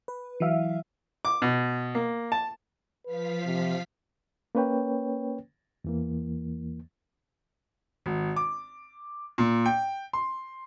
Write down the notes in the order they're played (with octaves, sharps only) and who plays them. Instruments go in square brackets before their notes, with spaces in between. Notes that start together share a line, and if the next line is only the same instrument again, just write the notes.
[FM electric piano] B4
E3 F#3 E5 F5
[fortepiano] D6
B2
A#3
A5
[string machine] F3 F5 B6 [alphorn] B4
[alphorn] C3
[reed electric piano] A#3 C#4 B4 C#5 G5
E2 E3 A#3
[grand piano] G#1
D6
A#2
G5
C6